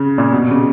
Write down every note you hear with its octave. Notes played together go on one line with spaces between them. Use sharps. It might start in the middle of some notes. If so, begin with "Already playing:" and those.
Already playing: C#3
A#2
B2
C#3